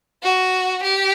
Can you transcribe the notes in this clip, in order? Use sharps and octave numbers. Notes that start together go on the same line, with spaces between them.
F#4
G4